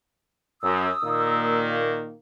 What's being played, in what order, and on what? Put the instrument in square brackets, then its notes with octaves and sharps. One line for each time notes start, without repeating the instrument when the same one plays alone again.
[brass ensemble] F#2 [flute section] D#6 E6
[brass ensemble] A#2 D#3 A#3